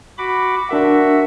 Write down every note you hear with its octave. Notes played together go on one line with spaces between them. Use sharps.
F#4 B5 D6
D4 F#4 A#4 E5 F#5